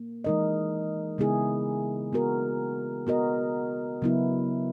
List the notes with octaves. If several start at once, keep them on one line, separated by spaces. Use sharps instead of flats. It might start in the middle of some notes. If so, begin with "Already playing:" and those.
Already playing: A#3
E3 G#3 D#4 A#4 D#5
C#3 G#3 B3 E4 G#4
B3 F#4 A#4
B3 F#4 A#4 D#5
C#3 F#3 B3 E4